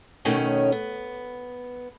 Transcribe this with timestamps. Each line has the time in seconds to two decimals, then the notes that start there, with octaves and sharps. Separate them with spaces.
0.25 B2 D#3 A3 C#4 C#5 D#5
0.72 B3